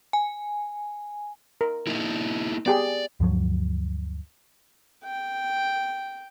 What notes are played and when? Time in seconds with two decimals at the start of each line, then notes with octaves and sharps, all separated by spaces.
0.13 G#5
1.61 A#4
1.87 A#3 D#4 E4
2.66 B3 G4 G#4 D5
3.20 D2 G2 F3 F#3
5.04 G5